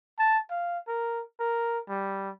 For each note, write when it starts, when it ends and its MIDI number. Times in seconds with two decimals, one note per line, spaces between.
0.19 0.39 81
0.51 0.79 77
0.88 1.22 70
1.40 1.79 70
1.89 2.30 55